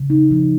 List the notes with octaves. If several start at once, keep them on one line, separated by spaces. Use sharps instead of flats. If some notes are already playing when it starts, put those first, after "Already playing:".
Already playing: C#3
D#4
F3